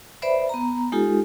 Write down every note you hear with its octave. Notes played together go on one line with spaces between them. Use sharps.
B4 C5 D5 E5 B5
B3 A#5
G#3 D#4 F4 G4 A4